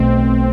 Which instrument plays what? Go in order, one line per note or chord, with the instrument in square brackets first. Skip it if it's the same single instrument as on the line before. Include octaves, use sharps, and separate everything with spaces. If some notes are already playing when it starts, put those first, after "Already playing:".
Already playing: [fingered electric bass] B1 B2 A3 [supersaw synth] C4